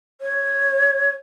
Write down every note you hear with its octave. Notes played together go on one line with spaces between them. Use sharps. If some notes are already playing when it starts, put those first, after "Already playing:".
C#5